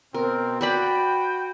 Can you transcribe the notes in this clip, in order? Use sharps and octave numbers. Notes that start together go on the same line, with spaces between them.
B2 C4 A#4
F#4 B4 D5 G5 B5